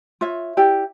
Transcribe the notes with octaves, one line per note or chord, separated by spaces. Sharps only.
F4 C#5 E5
E4 G4 D5